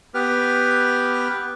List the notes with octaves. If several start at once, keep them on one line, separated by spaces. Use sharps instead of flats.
B3 G4 B4 F6